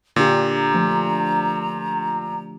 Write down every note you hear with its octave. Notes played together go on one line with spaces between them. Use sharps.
A#2 D3 D4 G4 A#5
F3 A3